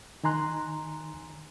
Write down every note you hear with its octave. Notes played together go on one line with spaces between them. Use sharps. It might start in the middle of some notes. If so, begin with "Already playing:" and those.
D#3 D#4 G#5 A#5 C6 F#6